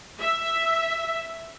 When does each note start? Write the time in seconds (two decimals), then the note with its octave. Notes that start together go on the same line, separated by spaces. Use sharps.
0.19 E5